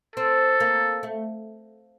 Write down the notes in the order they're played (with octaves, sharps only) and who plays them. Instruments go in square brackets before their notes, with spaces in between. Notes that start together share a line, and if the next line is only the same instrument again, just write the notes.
[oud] C4 [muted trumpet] A4
[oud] A#3
A3